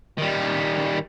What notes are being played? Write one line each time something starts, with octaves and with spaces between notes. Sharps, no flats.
D#3 G3